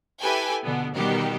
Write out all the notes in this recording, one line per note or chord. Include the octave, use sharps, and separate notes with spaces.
E4 G4 A4 B4 G5 G#5
B2 D3 B3
B2 D#3 G3 B3 G4